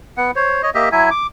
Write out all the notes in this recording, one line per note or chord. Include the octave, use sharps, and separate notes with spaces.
B3 F#5
C5 C#5
C#5 D#5
A#3 G4 D#5 E5
F#3 E4 E5 G#5
D6